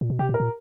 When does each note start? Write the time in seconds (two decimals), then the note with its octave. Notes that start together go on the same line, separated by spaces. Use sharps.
0.01 A#2
0.10 B2
0.19 C3 G4
0.29 A#2
0.34 A#4
0.40 A#2